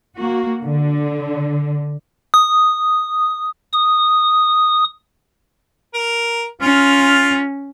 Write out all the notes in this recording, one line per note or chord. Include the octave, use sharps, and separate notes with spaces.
A#3 F#4
D3
D#6
D#6
A#4
C#4 F4 F6